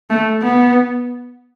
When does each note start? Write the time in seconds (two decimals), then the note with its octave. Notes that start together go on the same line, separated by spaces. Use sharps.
0.10 A3
0.43 B3